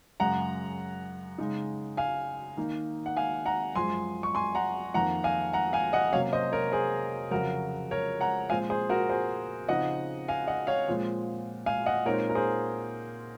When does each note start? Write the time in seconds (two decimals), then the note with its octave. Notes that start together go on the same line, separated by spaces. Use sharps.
0.20 F#2 C#3 G#3 F#5 A#5
1.38 C#3 G#3 D#4
1.97 F5 G#5
2.57 D#3 A#3 D#4
3.06 F#5
3.17 F5 G#5
3.46 F#5 A#5
3.75 F#2 F3 G#3 G#5 C6
4.23 C#6
4.35 G#5 C6
4.55 F#5 A#5
4.94 F2 D#3 A#3 F#5 A#5
5.24 F5 G#5
5.53 F#5 A#5
5.73 F5 G#5
5.93 D#5 F#5
6.13 C3 F#3 A#3 C#4 C#5 F5
6.33 C5 D#5
6.52 A#4 C#5
6.72 G#4 C5
7.31 F2 C#3 F#3 F#4 A#4
7.91 A#4 C#5
8.21 F#5 A#5
8.50 A#2 F3 G#3 C4 F5 G#5
8.70 G#4 C5
8.90 F#4 A#4
9.10 G#4 C5
9.68 C#3 F3 C4 D#4 D#5 F#5
10.28 F5 G#5
10.47 D#5 F#5
10.67 C#5 F5
10.87 A#2 F3 G#3 C4
11.66 F5 G#5
11.86 D#5 F#5
12.05 A#2 G#3 C4 D#4 A#4 C#5
12.30 A#4
12.35 G#4 C5